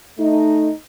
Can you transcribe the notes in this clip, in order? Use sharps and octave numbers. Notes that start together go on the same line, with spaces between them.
A3 D#4